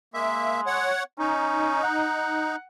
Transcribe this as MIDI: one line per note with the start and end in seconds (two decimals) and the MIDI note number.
0.14 0.87 56
0.14 0.61 58
0.14 0.61 76
0.66 1.03 73
0.66 1.03 78
1.19 1.83 61
1.19 2.56 63
1.83 2.64 78